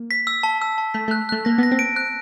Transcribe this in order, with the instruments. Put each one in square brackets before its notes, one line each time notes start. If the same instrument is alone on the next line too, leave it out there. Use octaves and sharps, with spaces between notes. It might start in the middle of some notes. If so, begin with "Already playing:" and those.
Already playing: [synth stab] A#3
[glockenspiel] B6
E6
A5
E6
A5
[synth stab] A3 [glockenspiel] B6
[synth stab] A3 [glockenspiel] F#6
[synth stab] A3 [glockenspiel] F#6
[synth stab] A#3 [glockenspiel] A#6
[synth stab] B3 [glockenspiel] A#6
[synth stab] C4
[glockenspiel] D7
F#6